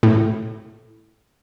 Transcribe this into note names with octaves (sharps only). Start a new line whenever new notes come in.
A2